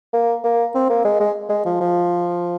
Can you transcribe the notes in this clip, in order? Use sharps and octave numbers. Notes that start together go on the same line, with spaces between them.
A#3
A#3
C4
A#3
G#3
G#3
G#3
F3
F3